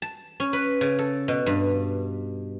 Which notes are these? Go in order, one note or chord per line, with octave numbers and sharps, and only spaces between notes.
A5
C#4
B4
C#3
A4
B2
G2